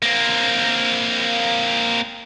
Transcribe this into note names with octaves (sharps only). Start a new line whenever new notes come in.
A#3 C4